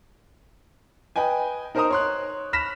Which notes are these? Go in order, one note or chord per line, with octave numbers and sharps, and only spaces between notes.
B4 D#5 G5 G#5
D#4 A#4 C5 D#5 A#5 D#6
C#5 C6 F#6
B5 F6 A#6 B6 E7